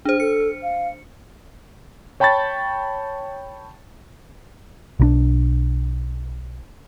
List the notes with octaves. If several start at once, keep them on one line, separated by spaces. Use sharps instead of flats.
D4 G#4 C5
A4 C#7
F5
C#5 G5 A5 B5 C#6 A6
B1 D#3 D4